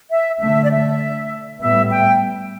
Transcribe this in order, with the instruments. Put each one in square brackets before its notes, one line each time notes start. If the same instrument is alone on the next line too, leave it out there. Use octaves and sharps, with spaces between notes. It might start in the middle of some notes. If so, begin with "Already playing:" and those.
[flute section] E5
[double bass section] D3 A3 [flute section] E5
[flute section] D5
E5
[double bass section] A2 G3 B3 [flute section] E5
[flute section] G5